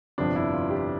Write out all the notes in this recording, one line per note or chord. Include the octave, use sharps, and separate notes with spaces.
G1 F2 C3 F3 D4
E4
F4
G4